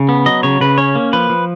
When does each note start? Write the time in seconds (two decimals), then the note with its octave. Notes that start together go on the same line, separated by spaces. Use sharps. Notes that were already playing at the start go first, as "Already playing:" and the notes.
Already playing: C#3
0.09 B3
0.26 F#3 D#5
0.43 C#3 C#5
0.61 C#3 B4
0.78 C#4 C#5
0.95 A#3
1.13 F3 B4
1.30 F3